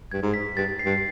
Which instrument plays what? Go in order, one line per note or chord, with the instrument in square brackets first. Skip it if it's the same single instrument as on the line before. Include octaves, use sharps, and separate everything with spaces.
[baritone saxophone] G2 [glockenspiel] G#6
[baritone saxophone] G#2
[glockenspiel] B6
[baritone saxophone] G2 [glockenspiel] A6
[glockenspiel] C7
[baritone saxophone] G2